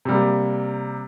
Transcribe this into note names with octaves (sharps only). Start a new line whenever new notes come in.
C3 G3 A#3